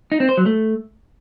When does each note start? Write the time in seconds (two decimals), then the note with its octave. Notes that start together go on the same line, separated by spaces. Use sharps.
0.12 D#4
0.20 C4
0.29 C5
0.37 F#3
0.46 A3